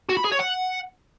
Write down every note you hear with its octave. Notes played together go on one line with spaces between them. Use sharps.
F#4
B5
G#4
C#5
F#5